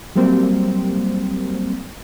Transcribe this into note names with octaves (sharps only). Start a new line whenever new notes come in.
F#3 G3 A#3 C4